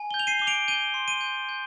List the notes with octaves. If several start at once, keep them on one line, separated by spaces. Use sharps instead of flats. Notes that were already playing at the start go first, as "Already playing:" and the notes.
Already playing: G#5
G7
G6
F7
C7 D#7
D6 G7
D7 F7
G6 D#7 G7
C6
D#7 G7
G6
G6